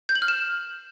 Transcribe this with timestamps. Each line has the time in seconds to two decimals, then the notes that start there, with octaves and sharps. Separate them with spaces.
0.09 G6
0.16 F#7
0.22 F6
0.28 E7